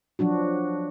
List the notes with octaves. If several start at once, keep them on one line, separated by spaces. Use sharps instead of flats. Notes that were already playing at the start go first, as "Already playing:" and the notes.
F3 F#3 D4 F#4